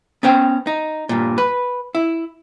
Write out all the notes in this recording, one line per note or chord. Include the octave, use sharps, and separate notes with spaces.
B3 C#4 C5 G5
D#4
G2 A#2
B4
E4